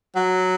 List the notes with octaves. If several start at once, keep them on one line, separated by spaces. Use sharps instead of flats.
F#3